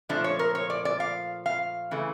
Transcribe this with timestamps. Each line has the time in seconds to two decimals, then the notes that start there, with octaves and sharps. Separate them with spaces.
0.09 A#2 F3 A3 D4
0.24 C#5
0.39 A#4
0.55 C#5
0.70 D5
0.85 D5
1.00 F5
1.46 F5
1.91 C#3 E3 A3